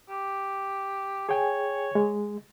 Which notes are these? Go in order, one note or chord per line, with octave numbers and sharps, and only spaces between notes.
G4
G#4 C#5 G5 G#5
G#3